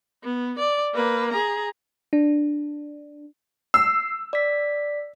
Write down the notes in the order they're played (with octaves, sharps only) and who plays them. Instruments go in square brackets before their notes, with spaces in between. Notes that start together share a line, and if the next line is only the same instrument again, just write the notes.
[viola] B3
D5
A#3 B4
G#4 A#5
[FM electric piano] D4
[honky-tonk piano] E6 [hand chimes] C7
[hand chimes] D5 B6